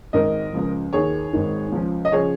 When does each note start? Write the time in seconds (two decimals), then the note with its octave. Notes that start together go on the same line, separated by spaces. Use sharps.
0.13 G#1 G#2 D#3 A#4 D#5
0.53 C#2 C#3 F3
0.93 D#2 D#3 G#4 C#5
1.33 G#1 G#2 D#3
1.72 C#2 C#3 F3
2.05 D#5
2.12 C#3 F3 G#4 C#5